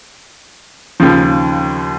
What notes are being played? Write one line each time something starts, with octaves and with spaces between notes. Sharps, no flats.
D#2 C#3 F3